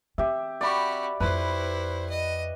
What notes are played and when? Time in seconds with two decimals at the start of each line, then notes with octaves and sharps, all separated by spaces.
0.18 C4 G4 E5
0.61 F#4 G4 D5 B5 C#6
1.20 F2 E4 F4 B4 C5
2.09 D#5